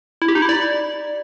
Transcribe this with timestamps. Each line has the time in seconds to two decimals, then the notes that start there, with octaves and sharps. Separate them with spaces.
0.22 E4
0.28 G4
0.35 D#4
0.42 E4
0.49 D5